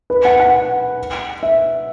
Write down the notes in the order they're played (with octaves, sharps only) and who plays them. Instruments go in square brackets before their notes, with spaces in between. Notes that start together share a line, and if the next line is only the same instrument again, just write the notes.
[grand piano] B4
F#5
F#5
E5